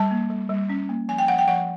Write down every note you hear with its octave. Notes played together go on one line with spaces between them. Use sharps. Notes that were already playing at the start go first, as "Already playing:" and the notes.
Already playing: G3 A5
A#3
G3
G3
C#4
A#3
F3 G#5
G5
F3 F#5
G5
F3 F#5